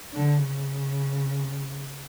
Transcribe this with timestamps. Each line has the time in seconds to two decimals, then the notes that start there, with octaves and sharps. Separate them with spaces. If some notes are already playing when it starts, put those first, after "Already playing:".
0.13 D3
0.43 C#3